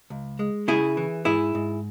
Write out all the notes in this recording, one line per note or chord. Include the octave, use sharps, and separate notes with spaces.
C#2
G#3
C#3 E4 G#4
E3
G#2 E4 G#4
G#2